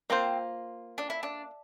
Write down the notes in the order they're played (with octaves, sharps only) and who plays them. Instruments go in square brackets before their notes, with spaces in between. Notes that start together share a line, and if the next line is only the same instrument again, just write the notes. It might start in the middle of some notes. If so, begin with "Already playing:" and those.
[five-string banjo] A#3 F4 C5 [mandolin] C4
[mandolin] D4
E4
D4